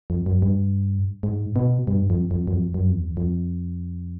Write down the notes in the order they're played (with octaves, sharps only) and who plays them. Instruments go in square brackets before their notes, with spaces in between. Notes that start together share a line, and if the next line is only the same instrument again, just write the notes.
[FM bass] F2
F#2
G2
G#2
B2
G2
F2
F2
F#2
F2
F#2
F2
E2
F2